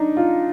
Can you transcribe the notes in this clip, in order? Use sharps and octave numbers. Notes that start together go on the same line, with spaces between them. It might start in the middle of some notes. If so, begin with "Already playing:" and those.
Already playing: D4 D#4
F4